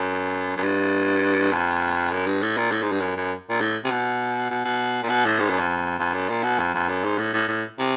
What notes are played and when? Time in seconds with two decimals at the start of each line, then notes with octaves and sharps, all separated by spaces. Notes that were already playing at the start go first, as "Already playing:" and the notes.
Already playing: F#2
0.57 F#2
0.63 G2
1.53 F2
2.12 F#2
2.27 G2
2.42 A2
2.57 A#2
2.72 A2
2.82 G#2
2.92 G2
3.01 F#2
3.17 F#2
3.50 A#2
3.61 A2
3.85 C3
3.91 B2
4.51 B2
4.65 B2
5.03 A#2
5.09 B2
5.25 A2
5.40 G#2
5.49 F#2
5.59 F2
5.99 F2
6.14 F#2
6.30 A#2
6.43 B2
6.59 F2
6.74 F2
6.89 F#2
7.04 G#2
7.18 A2
7.33 A2
7.48 A2
7.79 C3